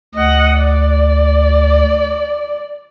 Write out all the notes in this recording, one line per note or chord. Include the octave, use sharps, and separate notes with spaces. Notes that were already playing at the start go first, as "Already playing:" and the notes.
D2 D#5 F#5
D5